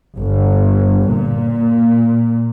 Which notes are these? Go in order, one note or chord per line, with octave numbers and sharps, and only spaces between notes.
G1
A#2